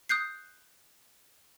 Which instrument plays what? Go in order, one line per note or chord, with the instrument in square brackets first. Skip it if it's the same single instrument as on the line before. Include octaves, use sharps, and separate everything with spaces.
[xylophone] D#6 F#6 G6 C7